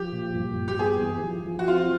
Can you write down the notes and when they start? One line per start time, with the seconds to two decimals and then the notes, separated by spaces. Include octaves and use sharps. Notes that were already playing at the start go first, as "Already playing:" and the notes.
Already playing: F3 G4
0.12 A#2
0.35 G2
0.56 G2
0.68 G4
0.79 B3 G#4
1.01 E3
1.23 F3
1.46 F3
1.59 F#4
1.68 C4 F4